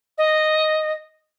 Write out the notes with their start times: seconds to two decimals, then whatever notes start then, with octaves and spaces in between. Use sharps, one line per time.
0.18 D#5